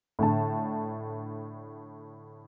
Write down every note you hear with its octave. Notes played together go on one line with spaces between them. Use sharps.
A2 D3 A5